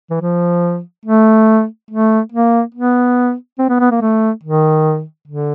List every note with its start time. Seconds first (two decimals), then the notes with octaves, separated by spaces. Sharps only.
0.11 E3
0.21 F3
1.06 A3
1.91 A3
2.32 A#3
2.75 B3
3.59 C4
3.69 B3
3.80 B3
3.91 A#3
4.01 A3
4.44 D#3
5.28 D3